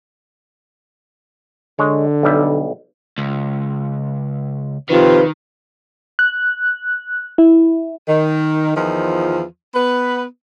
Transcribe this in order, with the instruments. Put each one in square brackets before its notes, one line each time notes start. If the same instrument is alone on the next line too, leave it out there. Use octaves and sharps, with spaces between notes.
[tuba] D3 [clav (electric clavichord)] G#3 C#5
[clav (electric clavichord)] B1 G3 E5
[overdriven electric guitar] C#2
[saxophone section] F2 C3 F4 [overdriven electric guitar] D#3 [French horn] B4
[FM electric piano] F#6
E4
[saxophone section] D#3
E2 D#3 F3
B3 B4